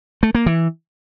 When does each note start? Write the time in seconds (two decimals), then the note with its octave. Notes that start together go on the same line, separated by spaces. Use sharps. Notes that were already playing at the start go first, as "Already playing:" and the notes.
0.23 A3
0.35 A#3
0.46 E3